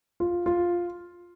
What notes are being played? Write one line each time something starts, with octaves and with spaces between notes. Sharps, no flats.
F4
F4